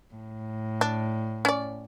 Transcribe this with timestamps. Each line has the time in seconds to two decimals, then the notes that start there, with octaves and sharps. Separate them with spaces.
0.16 A2
0.81 D4
1.45 C#4 D5